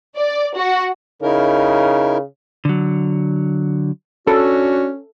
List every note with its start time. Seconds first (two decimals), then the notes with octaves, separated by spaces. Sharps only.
0.17 D5
0.57 F#4
1.22 C#3 D#4 E4 A#4
2.65 D3 F#3
4.27 C#4 D4 F#4 A4